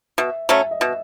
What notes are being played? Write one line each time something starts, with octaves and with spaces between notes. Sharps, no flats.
B2 E5
F#3 A3 C#4 E5
D#5
B2 E5